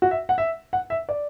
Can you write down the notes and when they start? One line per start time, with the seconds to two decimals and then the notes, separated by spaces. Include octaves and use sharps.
0.02 F#4
0.11 E5
0.29 F#5
0.38 E5
0.73 F#5
0.90 E5
1.09 D5